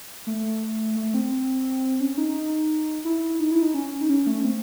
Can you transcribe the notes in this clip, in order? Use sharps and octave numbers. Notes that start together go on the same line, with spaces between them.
A3
A3
C4
C4
C#4
D#4
D#4
E4
D#4
E4
D#4
C#4
D#4
C#4
A3
C4